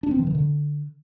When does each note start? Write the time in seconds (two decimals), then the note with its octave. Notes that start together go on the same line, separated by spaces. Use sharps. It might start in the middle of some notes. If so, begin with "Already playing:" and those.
0.03 D4
0.11 C4
0.19 E3
0.27 D#3
0.35 D3